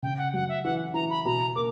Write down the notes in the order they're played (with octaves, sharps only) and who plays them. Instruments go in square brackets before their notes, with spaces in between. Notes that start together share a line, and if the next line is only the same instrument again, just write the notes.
[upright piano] C#3 [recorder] G5
[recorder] F#5
[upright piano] F#2 [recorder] F#5
[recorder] E5
[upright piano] E3 [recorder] F#5
[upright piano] E3 [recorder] A#5
[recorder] B5
[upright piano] B2 [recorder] A#5
[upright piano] A#3 [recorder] D6